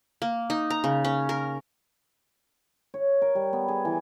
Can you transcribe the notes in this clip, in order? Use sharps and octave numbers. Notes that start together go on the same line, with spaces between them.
A#3
D#4
A#5
C#3
C#4
A#4
C#5
A#4
G3
B3
G#4
E3